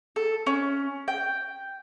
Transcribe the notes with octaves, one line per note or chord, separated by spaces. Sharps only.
A4
C#4
G5